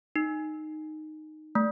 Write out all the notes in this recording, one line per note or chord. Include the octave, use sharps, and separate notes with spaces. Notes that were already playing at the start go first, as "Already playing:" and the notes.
D#4
A3